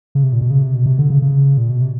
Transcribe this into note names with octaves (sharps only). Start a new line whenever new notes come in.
C#3
C3
A#2
B2
C#3
C3
B2
C3
D3
C#3
C#3
A#2
B2
C3